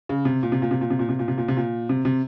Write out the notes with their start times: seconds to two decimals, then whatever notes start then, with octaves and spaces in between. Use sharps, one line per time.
0.09 C#3
0.25 C3
0.43 A#2
0.52 C3
0.62 A#2
0.71 C3
0.81 A#2
0.90 C3
0.99 A#2
1.09 C3
1.19 A#2
1.28 C3
1.38 A#2
1.48 C3
1.57 A#2
1.89 C3
2.05 C3